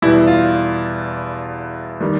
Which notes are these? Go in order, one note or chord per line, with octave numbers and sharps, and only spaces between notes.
E2 B2 G3 E4
F4
D#3 G3